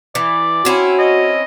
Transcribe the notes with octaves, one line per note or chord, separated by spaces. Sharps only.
E3 D5
C4 C#4 E4 F#4
D#5